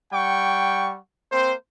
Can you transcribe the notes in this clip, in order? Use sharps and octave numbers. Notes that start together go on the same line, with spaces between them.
G3 F#5 G5 C#6
A#3 C4 C5